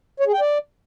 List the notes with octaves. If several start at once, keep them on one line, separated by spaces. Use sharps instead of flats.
C#5
G#4
G5
D5